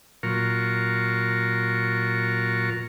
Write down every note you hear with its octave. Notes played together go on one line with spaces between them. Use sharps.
A#2 F#3 F4 A#4 C#6